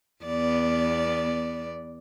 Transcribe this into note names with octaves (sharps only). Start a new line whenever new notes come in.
E2 B3 D5